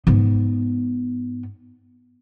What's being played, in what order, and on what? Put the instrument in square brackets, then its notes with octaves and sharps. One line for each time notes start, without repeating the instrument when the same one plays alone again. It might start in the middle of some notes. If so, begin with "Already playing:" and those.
[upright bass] G#2 B3